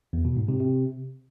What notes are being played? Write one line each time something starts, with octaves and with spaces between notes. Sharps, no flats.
E2
B2
G#2
C3
C3